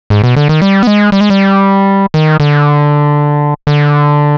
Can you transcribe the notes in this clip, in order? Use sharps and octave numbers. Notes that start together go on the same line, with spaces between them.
G#2
B2
D3
D#3
G3
B3
G#3
G3
G#3
G3
D#3
D3
D3